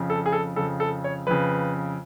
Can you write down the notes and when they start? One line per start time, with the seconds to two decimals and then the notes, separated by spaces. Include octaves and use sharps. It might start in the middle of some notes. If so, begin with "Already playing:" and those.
Already playing: F2 C#3
0.10 A4
0.26 G#4
0.33 A4
0.56 F2 C#3 A4
0.80 A4
1.04 C#5
1.27 F2 C#3 B4